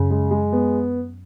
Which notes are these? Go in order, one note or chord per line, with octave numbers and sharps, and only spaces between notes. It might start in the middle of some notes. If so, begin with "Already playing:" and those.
Already playing: F#2 C#3
G#3
G#3
B3